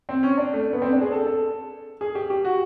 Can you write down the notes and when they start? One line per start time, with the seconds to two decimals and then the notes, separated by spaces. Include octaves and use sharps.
0.09 C4
0.23 C#4
0.38 D4
0.53 A3
0.73 B3
0.82 C4
0.92 D4
1.01 G#4
1.12 A4
1.27 A4
2.01 G#4
2.15 G4
2.30 G4
2.45 F#4